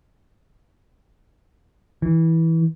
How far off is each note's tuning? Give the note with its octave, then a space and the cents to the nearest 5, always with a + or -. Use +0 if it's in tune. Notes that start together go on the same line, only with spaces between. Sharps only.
E3 -15